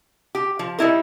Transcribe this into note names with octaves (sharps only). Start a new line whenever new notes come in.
G4
F3
G3 D#4 E4 A#4